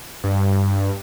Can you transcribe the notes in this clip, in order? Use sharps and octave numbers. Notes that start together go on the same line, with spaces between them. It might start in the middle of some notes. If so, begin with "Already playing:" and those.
G2